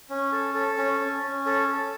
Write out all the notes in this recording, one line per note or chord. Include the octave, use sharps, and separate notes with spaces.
C#4
A4
A4
C#4
C#4
C#4
A4
A4